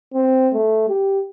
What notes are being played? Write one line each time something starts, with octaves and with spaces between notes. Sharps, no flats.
C4
A3
G4